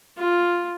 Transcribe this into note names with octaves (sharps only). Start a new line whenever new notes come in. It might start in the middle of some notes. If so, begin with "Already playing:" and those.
F4